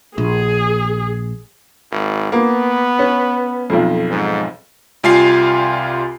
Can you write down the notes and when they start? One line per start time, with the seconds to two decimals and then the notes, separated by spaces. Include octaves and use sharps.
0.18 A#1 G#4
1.91 G#1
2.32 A#3 B3
2.99 C#4
3.70 B1 F2
4.10 G#2
5.04 C2 G3 F4 F5 G#5 C7